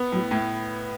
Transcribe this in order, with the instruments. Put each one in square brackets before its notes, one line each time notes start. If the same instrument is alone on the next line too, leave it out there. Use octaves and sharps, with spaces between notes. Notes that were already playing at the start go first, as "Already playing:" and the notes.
Already playing: [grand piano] B3
[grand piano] A2 [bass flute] F#3
[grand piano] A2 [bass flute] A3